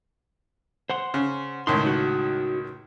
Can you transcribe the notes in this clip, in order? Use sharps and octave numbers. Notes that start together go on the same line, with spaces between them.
C5 F#5 C6
C#3
C#2 A2 D#3 C6
D#4 F#4